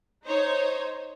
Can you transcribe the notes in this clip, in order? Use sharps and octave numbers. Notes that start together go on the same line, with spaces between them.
D#4 C5 C#5